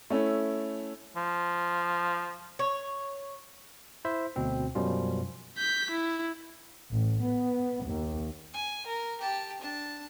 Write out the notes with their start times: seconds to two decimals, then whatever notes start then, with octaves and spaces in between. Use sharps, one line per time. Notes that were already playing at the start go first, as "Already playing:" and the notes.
0.10 A3 C#4 E4
1.17 F3
2.59 C#5
4.05 E4 C5 E5
4.36 D2 B2 C4
4.75 F#2 B2 F3 G3 C#4 F4
5.58 G6 B6
5.91 E4
6.92 A1
7.25 B3
7.86 D#2
8.54 G#5
8.87 A#4
9.21 G4 A5
9.62 D4 A5